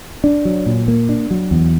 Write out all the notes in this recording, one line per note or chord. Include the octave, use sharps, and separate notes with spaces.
D4
F#3
A#2
A#3
D4
F#3
E2